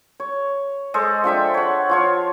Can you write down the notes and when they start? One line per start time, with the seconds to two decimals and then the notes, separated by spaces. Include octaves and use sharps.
0.20 C#5
0.94 G#3 A4 C5 D#5
1.24 F3 D4 E5 G5
1.54 C#5 F#5
1.89 F3 F4 C#5